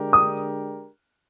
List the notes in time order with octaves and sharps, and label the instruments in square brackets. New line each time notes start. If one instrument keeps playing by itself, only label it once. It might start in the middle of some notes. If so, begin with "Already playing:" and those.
Already playing: [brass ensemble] D3 G#3 D4 G4 A#4
[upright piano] D#6